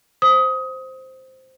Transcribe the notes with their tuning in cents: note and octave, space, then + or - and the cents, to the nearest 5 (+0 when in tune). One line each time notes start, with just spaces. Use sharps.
C5 +0 D#6 +20